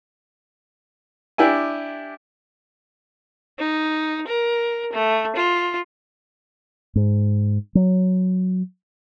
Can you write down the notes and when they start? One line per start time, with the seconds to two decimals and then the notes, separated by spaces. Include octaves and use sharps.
1.38 D4 E4 G4 E5 G#5
3.59 D#4
4.27 A#4
4.93 A3
5.36 F4
6.95 G#2
7.75 F#3